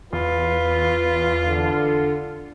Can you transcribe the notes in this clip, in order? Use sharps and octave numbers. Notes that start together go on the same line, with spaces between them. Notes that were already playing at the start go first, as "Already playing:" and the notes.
E2 F4 B4
D3